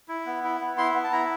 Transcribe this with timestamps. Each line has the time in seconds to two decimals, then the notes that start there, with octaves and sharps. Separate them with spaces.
0.08 E4
0.26 B3
0.44 E4
0.61 B3
0.78 E4 C6
0.94 B3
1.04 A5
1.12 E4 A#5